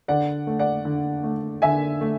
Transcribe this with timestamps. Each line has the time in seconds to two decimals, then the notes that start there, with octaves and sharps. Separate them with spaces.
0.08 D3 D5 F#5
0.47 A3
0.59 D5 F#5
0.85 D3
1.24 A3
1.62 D3 E5 G#5
2.01 A3